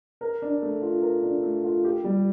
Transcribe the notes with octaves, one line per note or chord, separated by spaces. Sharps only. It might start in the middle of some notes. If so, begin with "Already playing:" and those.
A#4
D4
A3
F4
A#4
D4
A3
F4
G4
G3